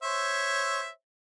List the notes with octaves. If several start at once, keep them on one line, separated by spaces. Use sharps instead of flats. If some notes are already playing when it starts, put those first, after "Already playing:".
C5 C#5 E5